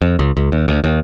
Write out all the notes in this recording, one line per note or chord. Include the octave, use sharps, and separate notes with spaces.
F2
C#2
C#2
D#2
D2
D#2